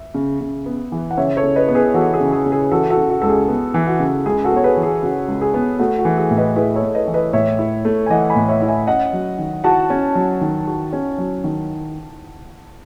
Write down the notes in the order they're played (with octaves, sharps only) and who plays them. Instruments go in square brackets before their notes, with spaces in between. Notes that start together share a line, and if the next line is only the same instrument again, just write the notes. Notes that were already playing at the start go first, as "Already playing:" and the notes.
Already playing: [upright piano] E5
[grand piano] C#3
C#3
B3
E3
[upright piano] F#5
[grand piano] C#3 [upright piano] C#5 E5
[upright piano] A4 C#5
[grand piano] C#3
[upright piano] B4 D#5
[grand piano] B3
[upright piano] G#4 B4
[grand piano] E3 [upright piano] F#4 A4
[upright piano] G#4
[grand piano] C#3
[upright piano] G#4
[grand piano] C#3
[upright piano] G#4
[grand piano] E3 [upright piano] F#4 A4
[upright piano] F#4 A4
[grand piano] C#3
[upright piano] F#4
[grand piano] C#2 [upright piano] A4
[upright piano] G#4
[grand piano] B3
E3
[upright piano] F#4
[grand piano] C#3
[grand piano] C#2 [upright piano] G#4
[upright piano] F#4 A4
[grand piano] B3
[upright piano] C#5
G#4 B4
[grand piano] E3
[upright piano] G#4
[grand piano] C#3 [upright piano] F#4
[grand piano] C#2
[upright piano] G#4
[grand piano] B3
[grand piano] A3 [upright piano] F#4
[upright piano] F#4
[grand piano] E3
[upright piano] G#4
[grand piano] A2
[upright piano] B4 D#5
[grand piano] E4 [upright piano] G#4 B4
[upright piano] A4 C#5
[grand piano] A3
[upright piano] B4 D#5
[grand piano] E3
[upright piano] B4 D#5
[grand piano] A2 [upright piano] C#5 E5
[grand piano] E4
A3
[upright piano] G#5
[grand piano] E3 [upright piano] D#5 F#5
[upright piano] G#5 B5
[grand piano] A2
[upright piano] C#5 E5
[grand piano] E4
[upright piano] E5 G#5
[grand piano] C#4 [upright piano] D#5 F#5
[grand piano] F#3
D#3
[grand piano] F#4 [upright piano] F#5 A5
[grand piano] C#4
F#3
D#3
F#4
C#4
F#3
D#3